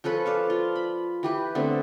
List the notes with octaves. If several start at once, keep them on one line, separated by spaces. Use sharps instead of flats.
F3 C#4 A4 B4
D5 F5 A5
F4
B5
E3 G4 B4
D3 A3 B3 C4